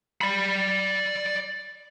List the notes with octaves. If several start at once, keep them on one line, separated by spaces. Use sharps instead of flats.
D5 B5